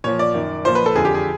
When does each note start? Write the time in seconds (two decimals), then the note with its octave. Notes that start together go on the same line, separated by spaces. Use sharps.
0.04 A#2 F3 C#5
0.19 D5
0.34 F#2 D#3
0.65 A#2 F3 C5
0.75 B4
0.86 A4
0.95 F2 D3 F3 G#4
1.05 G4
1.14 G#4